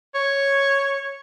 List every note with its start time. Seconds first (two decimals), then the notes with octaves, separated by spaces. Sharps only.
0.14 C#5